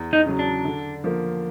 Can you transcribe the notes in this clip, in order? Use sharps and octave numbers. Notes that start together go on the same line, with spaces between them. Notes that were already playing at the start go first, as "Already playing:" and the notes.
Already playing: E2
D#4
C#3 F#3
D4
D3
F3 A#3